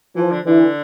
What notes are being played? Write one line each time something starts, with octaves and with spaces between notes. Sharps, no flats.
E3 F3
D3
D3 E3